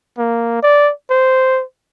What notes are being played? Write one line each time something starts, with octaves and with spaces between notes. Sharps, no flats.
A#3
D5
C5